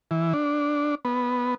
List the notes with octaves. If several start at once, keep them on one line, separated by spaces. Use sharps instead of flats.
E3
D4
B3